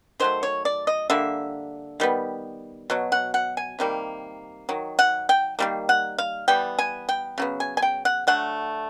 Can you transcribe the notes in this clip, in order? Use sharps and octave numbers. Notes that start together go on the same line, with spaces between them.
D#3 F#3 A3 C5
C#5
D5
D#5
D3 G3 A#3 E5
D#3 G3 B3
B2 F#3
F#5
F#5
G#5
C3 D#3 G3 A#3
D#3 F#3
F#5
G5
D#3 G3 A#3
F#5
F5
E3 G3 B3 G5
G#5
G5
C#3 F#3 B3
G#5
G#5
G5
F#5
D3 F#3 A3 F#5